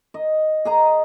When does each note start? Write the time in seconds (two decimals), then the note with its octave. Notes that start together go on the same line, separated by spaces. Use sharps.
0.14 D#5
0.65 G#4 D#5 A#5